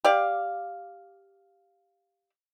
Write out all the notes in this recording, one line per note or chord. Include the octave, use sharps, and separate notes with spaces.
G4 D5 F5